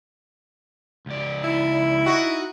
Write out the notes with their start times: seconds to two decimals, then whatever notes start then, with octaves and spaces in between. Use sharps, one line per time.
1.06 C#2 D5
1.44 E4
2.05 D#4 F#4